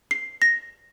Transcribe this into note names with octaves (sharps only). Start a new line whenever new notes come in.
C7
A#6